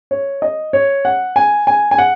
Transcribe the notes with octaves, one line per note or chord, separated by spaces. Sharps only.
C#5
D#5
C#5
F#5
G#5
G#5
G#5
F#5